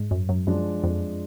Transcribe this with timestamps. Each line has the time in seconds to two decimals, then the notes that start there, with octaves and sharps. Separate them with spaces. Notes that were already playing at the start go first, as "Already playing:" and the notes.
Already playing: G#2
0.11 F#2
0.29 F#2
0.47 F#2 F3 G#3 D4
0.83 F2